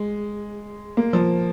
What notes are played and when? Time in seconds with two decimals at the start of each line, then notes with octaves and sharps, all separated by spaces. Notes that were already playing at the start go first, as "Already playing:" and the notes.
Already playing: G#3
0.97 A#3
1.13 F3